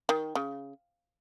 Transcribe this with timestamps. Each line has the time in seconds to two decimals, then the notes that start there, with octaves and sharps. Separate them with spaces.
0.09 D#3
0.35 C#3